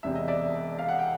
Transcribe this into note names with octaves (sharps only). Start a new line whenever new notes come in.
E1 E2 C3 E5
D#5
D5 E5
F5
F#5
G5